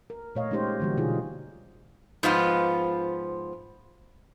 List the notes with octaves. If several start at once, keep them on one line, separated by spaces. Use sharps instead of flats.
A#4
A#2 A3 C#5 D#5 F5
G#3 C#4 D#4 G4 C5 C#5
D3 E3 G3 A#3 F#4
B2 D3 D#4 F4 G#4
G#2 F3 B3 F4